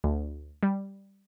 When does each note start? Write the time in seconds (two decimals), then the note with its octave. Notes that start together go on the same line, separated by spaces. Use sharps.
0.04 D2
0.63 G3